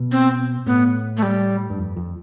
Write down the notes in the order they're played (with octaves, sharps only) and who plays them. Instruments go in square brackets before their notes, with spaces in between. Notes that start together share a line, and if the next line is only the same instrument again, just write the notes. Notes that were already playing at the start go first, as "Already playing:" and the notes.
Already playing: [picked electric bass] B2
[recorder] C4
[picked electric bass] A2 [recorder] B3
[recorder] A3
G3
[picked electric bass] G2
F2
F2